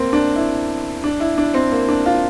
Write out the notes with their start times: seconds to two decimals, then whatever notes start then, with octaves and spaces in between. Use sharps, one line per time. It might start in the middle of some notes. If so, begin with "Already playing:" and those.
Already playing: A#3 C4
0.13 D4
0.36 E4
1.04 D4
1.20 E4
1.38 D4
1.54 C4
1.72 A#3
1.89 D4
2.06 F4